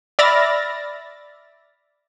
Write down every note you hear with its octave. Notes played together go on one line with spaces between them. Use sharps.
D5 E5 B5 F6 A6 A#6